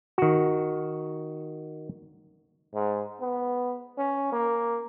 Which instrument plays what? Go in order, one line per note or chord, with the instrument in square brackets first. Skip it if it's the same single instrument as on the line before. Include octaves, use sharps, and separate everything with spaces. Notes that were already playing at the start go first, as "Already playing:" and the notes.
[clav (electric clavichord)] D#3 F#4
[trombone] G#2
B3
C#4
A#3